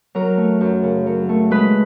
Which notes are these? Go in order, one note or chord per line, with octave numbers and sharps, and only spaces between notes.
F#3 A#4
A3
F#2
C#3
F#3
A3
G#3 B4